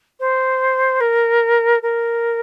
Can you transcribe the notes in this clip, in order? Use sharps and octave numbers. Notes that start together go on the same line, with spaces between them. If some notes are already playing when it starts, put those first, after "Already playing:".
C5
A#4
A#4